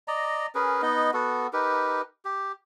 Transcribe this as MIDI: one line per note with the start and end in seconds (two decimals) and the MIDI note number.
0.08 0.47 74
0.08 0.47 75
0.08 0.47 82
0.55 0.82 61
0.55 0.82 68
0.55 0.82 70
0.55 0.82 71
0.82 1.11 59
0.82 1.11 63
0.82 1.11 75
1.14 1.47 59
1.14 1.47 66
1.14 1.47 69
1.53 2.02 63
1.53 2.02 67
1.53 2.02 70
1.53 2.02 71
2.25 2.52 67